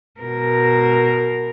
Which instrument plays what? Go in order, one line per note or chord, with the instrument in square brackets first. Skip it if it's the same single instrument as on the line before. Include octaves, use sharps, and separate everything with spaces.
[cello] B2 A#4